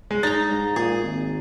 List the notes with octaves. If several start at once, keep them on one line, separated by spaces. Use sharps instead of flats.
G#3
D#4 A#5 A6
G#2
A#2 G#4
G#1